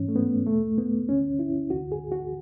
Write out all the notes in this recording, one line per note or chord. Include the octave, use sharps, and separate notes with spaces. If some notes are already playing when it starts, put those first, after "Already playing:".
Already playing: G#2 E3 C#4
A3
B3
E2 B2 A3
B3
D2 D3 C#4
E4
D2 D3 F#4
G#4
F#4